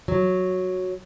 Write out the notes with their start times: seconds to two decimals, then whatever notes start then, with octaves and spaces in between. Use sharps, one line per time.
0.08 F#3